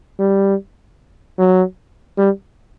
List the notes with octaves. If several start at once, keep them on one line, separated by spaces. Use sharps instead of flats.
G3
F#3
G3